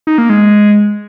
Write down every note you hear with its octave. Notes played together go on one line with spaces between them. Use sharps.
D#4
A#3
G#3